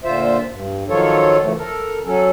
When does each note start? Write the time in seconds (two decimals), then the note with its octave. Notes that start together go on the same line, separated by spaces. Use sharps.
0.04 A#2 D3 F4 C5 E5
0.51 G2
0.89 D#3 F3 F#3 F4 A4 C#5
1.43 C#3 E3 F3 A3
1.58 A4 A#4
2.05 F#3 C#4 A4